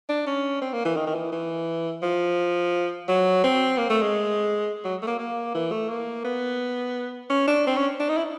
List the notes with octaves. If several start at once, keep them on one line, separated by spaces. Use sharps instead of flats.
D4
C#4
C4
A#3
E3
D#3
D#3
E3
E3
F3
F#3
C4
A#3
A3
G#3
F#3
A3
A#3
A#3
E3
A3
A#3
B3
C#4
D4
C4
C#4
D4
D#4
E4